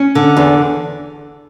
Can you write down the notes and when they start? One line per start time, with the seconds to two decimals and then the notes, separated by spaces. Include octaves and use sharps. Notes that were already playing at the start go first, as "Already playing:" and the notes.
Already playing: C#4
0.15 D3
0.37 E2